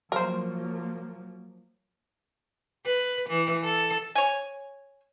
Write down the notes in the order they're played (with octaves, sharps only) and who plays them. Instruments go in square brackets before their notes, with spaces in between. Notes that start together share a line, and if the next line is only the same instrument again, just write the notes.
[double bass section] F3 F#3 A#3 [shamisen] A#4 C5
[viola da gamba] B4
E3
A4
[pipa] C#5 G#5